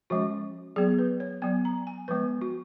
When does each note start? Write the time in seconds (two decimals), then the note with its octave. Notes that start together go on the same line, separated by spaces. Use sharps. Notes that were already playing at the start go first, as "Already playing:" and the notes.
0.10 F3 G#3 C#4 F#4
0.76 F#3 B3 G#4
0.99 B4
1.20 C#5
1.42 F#3 B3 G#5
1.65 A#5
1.87 G#5
2.08 F3 G#3 B3 B4
2.41 F#4